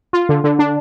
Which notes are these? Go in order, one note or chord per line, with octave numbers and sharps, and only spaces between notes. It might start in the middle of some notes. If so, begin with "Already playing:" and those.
F4
D3
D3
D4